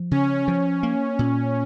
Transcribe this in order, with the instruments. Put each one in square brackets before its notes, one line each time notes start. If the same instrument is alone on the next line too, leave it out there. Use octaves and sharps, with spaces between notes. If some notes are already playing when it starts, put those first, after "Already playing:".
Already playing: [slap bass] F3
[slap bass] C#3 [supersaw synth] C#4
[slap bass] F3 [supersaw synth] C#4
[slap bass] A#3
A#2